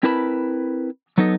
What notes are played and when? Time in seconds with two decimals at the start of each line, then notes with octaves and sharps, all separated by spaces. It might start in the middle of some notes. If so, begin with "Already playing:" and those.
0.03 C4 E4 A#4 B4 A5 B5
1.18 F#3 B3 D#4 A4 D#5